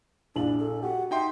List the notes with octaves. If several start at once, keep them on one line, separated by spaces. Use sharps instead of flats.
A#1 D4 E4 F#7
A4
F#4 G4 F#5
D#4 E5 G5 C6